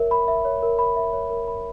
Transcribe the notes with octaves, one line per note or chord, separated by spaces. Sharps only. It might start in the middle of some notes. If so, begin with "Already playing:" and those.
Already playing: A#4 C#5 E5
B5
E5
C#5
A#4
B5
E5
C#5
A#4
B5